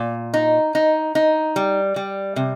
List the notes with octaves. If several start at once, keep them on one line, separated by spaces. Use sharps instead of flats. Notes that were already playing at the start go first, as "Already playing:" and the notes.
Already playing: A#2
D#4
D#4
D#4
G3
G3
C3